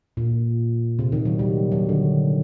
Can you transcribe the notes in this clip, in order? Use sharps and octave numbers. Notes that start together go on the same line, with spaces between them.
A#2
C3
D#3
F#3
G3
F#3
D3